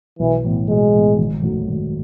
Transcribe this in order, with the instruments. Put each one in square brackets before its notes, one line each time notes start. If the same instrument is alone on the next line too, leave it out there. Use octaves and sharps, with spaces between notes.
[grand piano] B1 [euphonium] E3
[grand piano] A2 E3 B3
[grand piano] B1 [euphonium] G#3
[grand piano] A2 E3 B3
G#1
F#2 D#3 F#3 A3
G#1